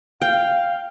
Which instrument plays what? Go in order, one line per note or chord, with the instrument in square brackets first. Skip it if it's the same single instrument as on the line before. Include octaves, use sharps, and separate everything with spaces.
[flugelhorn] F5 [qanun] G5